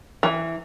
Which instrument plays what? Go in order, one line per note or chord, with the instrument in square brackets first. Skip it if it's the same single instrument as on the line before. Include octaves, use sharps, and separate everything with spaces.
[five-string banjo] E3